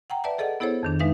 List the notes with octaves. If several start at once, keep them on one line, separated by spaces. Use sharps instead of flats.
F#5 G5 A#5
B4 D5 E5 A5
G#4 A4 D5 D#5 F#5
B3 E4 G#4 A4 C5 C#5
F2 D#3 D4
G#3 D#4 B4 E5 F5